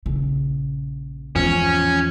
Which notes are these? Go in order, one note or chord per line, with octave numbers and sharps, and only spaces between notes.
A#1 C#3
G#1 E2 G#2 F3 C#4